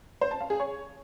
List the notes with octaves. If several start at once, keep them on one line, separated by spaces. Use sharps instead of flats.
C5
A5
F5
G#4
C#5